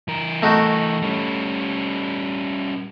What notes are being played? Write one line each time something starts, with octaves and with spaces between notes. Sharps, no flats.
E3 A#4
A3 D#4 F#4
G3 C#4